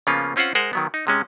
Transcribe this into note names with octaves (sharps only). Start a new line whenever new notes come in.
C#3 F3 A#3 B3 C#4 F4
C4 C#4 F4 C5 F#5
G#3 A#4 C5 F#5 G#5
D#3 F#3 B3
D#4
C3 G#3 C#4